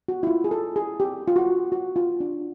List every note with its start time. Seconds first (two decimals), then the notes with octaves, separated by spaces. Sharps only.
0.08 F#4
0.23 E4
0.27 F4
0.44 G#4
0.51 A4
0.76 G#4
1.00 G4
1.28 F4
1.36 F#4
1.72 F#4
1.96 F4
2.20 D4